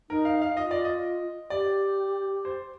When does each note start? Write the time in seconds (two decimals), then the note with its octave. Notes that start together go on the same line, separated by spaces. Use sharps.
0.10 D#4 A#4
0.25 F5
0.42 F5
0.57 F4 D#5
0.71 D5
0.85 D#5
1.50 G4 D5
2.45 C5